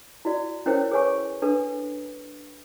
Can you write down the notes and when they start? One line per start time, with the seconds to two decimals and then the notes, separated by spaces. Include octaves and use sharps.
0.25 E4 F#4 D5
0.66 C#4 E4 A#4 C5 C#5 G5
0.91 G#4 B4 C#5 G#5 C#6
1.42 D4 A4 B4